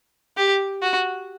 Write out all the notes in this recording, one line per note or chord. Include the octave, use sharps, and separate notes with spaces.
G4
F#4